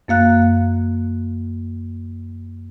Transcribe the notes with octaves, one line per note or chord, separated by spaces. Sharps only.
F#2 A#3 F5 F#6